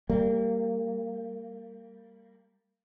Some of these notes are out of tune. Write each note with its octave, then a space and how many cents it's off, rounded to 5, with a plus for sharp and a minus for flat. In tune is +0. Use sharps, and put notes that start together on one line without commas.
G3 +0 A#3 -25